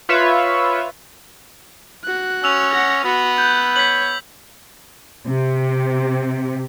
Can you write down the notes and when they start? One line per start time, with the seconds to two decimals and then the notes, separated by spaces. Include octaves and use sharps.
0.09 F4 B4 C#5 E5
2.04 F#4 F#6
2.44 C#4 E6 F7
2.73 F#5 A#6
3.04 B3 F#4
3.38 F#6 G6
3.76 C#5 B6 F#7
5.27 C3